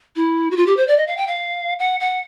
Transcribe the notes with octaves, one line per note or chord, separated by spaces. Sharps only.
E4
F#4
F4
G4
C5
D5
D#5
F5
G5
F5
F#5
F#5